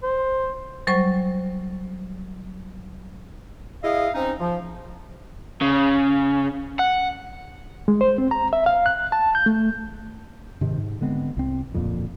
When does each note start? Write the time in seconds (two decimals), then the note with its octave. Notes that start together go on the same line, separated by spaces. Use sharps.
0.03 C5
0.87 F#3 G3 C5 C#6
3.83 E4 G#4 D#5 F5
4.14 C4 C#4 D#4
4.39 F3
5.61 C#3
6.79 F#5
7.88 G#3
8.01 C5
8.18 C4
8.31 A#5
8.53 E5
8.66 F5
8.86 F#6
9.12 A5
9.35 G6
9.46 A3
10.61 G#2 C3 D#3
10.78 G#2
11.01 D3 G#3 B3 C4
11.37 C2 C4
11.72 D1 F2 A#2